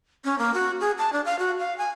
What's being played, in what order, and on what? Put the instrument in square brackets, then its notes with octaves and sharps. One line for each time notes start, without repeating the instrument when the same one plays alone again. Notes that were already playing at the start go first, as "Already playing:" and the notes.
[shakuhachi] C#4
A#3
F#4
G#4
A5
D4
F5
F#4
F5
G#5